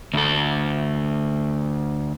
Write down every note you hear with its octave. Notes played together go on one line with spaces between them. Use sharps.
D2 A4